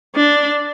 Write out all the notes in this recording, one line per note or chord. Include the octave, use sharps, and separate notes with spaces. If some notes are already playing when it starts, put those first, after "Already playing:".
D4